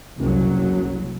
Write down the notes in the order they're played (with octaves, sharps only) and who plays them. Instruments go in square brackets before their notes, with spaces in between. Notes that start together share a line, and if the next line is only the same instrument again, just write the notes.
[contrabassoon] F#1 [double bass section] C2 F2 F#3